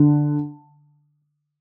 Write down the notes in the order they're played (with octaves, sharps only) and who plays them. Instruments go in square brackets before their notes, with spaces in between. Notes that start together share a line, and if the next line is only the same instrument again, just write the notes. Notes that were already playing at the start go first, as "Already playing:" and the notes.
Already playing: [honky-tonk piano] D3